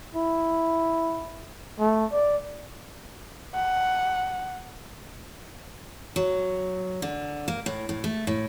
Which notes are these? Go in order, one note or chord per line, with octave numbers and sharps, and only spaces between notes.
E4
A3
D5
F#5
F#3
D3
A#3
A2
A2
A3
A2